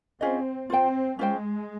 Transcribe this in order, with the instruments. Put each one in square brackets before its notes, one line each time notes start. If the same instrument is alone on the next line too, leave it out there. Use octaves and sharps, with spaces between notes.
[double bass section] C4 [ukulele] C#4 F4 G#4 D#5
[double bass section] C4 [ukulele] F4 C5 G5
[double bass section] G#3 [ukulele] C#4 F4 C5 G5